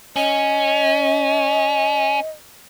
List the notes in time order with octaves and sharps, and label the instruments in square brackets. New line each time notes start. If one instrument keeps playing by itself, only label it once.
[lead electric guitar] C#4 [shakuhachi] D#5